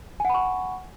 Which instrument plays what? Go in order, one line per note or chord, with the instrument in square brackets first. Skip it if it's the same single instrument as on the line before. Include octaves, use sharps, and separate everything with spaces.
[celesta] G#5
F#5
B5
C#6